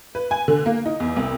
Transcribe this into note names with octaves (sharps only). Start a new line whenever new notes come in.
B4
G#5
D3
A#3
D#4
E2
C2